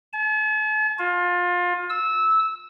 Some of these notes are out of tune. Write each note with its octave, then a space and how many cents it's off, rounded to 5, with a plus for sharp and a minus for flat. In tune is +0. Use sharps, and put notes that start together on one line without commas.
A5 -45
F4 +25
E6 -15